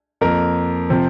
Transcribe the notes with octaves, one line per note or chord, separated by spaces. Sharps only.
F2 F3 A#3 A#4
C3 F3 C4